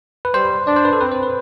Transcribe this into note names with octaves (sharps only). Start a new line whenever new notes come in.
B4
G3 C5
D4 D5
C5
B4
A4
C4 B4
C5
B4